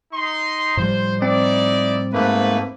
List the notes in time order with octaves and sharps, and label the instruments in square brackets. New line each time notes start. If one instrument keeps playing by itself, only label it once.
[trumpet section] D#4 C6
[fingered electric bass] A2 F3 G3 [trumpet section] C5
[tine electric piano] C4 [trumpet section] D#4 E4 D5
[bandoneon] G#2 A3 A#3 [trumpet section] B4